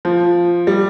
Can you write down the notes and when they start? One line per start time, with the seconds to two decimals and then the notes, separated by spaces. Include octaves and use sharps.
0.05 F3
0.67 G3